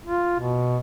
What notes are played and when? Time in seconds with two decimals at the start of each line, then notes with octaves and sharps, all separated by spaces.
0.06 F4
0.40 B2